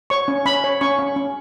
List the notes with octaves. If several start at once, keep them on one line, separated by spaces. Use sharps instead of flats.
C#5 C#6
C#4
C#4 B5
C#5
C#4 C#6
C#4
C#4